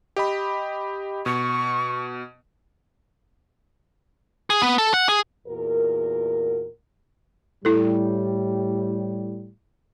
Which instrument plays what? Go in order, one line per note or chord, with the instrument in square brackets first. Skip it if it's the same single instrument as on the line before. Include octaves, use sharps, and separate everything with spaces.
[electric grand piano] G4 D#5 B5
[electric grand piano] B2 [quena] C#6
[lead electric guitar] G#4
B3
A4
F#5
G#4
[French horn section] E2 A#2 F#4 A#4
[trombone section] A2 G3 [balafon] E4 A4